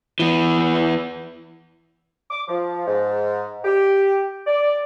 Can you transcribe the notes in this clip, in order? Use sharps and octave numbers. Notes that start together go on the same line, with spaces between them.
E3 B3
D6
F3
G#2
G4
D5